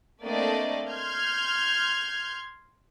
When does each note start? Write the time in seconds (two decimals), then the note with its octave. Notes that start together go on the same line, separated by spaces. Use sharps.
0.23 A3 A#3 C4 D4 D5 D#5
0.90 C6 F6 G6 G#6